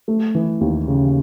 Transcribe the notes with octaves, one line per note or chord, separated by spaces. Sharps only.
A3
E3
D#2
C#3